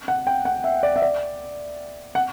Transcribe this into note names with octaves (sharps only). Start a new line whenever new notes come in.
F#5
G5
F#5
E5
D5
E5
D5
F#5